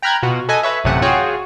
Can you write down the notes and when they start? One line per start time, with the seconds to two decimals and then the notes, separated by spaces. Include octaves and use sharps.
0.02 G5 A#5 B5 F6 F#6 G#6
0.23 B2 F4 F#4
0.49 A4 B4 D#5 G#5
0.63 B4 C#5 E5
0.84 A1 F#2 C3 A3 F#5 G#5
1.02 F4 F#4 G#4 C#5 G5